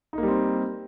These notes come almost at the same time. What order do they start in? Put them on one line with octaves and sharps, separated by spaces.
D#4 A#3 G3 C4